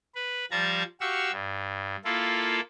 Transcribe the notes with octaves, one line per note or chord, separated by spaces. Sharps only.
B4
F3 G3 A5 A#5 G#6
F#4 G4 F5 C#6 E6
G2
A#3 E4 F4 A4